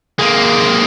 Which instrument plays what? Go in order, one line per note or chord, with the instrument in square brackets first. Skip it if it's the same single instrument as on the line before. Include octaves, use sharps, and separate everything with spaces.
[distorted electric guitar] G#3 A#3